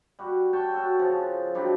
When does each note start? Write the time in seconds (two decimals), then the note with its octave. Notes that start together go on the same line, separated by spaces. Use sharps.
0.19 G3 F#4
0.53 C#5 G5 A5
0.74 F#4 A4
0.99 C#3 F3
1.54 D#3 F#3 G3 D4